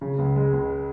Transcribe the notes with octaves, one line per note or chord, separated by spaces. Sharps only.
C#3
C#2
G#3
C#2